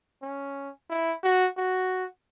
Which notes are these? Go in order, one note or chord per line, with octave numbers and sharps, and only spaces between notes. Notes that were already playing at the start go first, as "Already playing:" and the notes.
C#4
E4
F#4
F#4